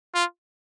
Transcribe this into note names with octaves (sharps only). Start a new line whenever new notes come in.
F4